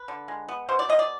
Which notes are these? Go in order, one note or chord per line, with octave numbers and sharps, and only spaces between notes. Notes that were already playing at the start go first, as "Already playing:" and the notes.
Already playing: B4
D3
G#3
B3
B2 C5
D5
B2 D#5
D5